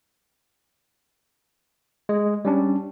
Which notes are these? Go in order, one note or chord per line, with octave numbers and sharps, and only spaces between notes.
G#3
G3 C#4 D4